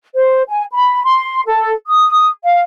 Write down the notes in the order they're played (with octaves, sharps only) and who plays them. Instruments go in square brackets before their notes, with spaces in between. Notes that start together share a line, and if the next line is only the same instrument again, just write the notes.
[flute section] C5
G#5
B5
C6
A4
D#6
F5